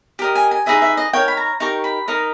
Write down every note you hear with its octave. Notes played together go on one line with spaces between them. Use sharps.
G4 A#4 D#5
G#5
G#5
D#4 G#4 B4 D#5 E5
E5
D#5
D#4 A#4 C#5 G5
B5
A#5
D#4 G4 A#4 C#6
B5
D#4 A#4 D#5